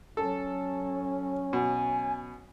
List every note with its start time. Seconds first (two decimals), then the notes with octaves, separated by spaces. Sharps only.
0.17 F#3 C#4 A4
1.53 B2 G#5